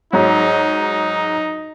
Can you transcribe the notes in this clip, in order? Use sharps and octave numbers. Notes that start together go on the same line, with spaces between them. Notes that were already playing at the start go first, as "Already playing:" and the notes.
G#2 F#3 D#4